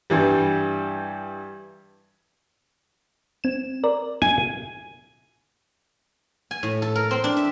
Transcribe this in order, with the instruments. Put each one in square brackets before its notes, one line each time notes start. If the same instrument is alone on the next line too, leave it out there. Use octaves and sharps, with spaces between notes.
[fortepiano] G2 E3 G3
[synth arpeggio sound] C4 E7
A#4 D5
[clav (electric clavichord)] G#5
[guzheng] G#5
A2
A4
A#4
C4
D4
E5